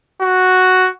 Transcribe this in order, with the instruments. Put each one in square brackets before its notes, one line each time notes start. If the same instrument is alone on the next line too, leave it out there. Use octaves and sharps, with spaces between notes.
[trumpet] F#4